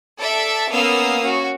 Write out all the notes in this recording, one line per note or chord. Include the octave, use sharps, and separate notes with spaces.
A4 D5 E5
A#3 B3 C#4 F5 D#6 E6
C#4 F#4